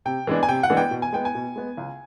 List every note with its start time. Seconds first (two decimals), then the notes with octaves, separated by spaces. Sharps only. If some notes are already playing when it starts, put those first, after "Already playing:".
0.05 C3 G5
0.27 E3 G#3 B3 D4
0.43 G#5
0.48 C3 G5
0.63 F#5
0.70 E3 G#3 B3 D4
0.77 G5
0.91 B2
1.02 G#5
1.13 G#3 B3 G5
1.25 G#5
1.35 B2
1.56 G#3 B3
1.77 C#2